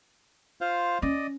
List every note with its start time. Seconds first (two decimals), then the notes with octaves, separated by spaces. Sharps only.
0.61 F4 C5 F5
1.02 C#4 D5 D#5